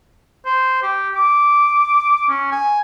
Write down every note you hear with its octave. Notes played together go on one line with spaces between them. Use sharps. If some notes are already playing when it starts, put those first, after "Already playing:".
C5
G4
D6
C#4
G#5